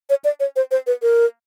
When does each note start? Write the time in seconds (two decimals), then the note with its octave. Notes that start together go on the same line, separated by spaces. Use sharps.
0.10 C#5
0.24 D5
0.40 C#5
0.56 C5
0.71 C5
0.87 B4
1.02 A#4